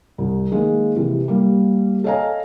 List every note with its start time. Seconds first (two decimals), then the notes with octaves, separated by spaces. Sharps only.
0.18 C2
0.51 D#3 G#3 A#3
0.96 C3 E3
1.28 G3 A#3
2.04 A4 C#5 D#5 F5 G#5 A#5